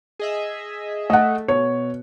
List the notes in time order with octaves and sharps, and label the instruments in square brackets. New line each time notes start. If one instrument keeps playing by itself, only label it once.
[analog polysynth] G#4 D#5 E5
[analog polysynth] A3 [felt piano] D#5 F#5
[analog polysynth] B2 [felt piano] C#5